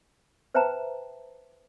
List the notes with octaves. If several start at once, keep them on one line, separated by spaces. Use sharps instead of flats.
B4 C5 E5 G5 A5 A#5